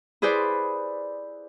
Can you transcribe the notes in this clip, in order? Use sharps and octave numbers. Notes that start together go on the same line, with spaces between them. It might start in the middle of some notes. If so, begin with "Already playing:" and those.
E4 G#4 B4 C5 D5